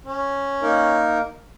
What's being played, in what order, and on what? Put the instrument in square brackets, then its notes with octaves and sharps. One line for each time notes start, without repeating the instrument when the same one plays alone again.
[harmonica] C#4
[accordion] A#3 D#4 A#4